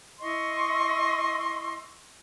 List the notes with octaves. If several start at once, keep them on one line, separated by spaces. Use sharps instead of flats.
E4 D#5 C6 C#6